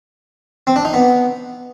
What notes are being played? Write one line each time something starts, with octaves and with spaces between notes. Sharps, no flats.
C4
D4
D#4
B3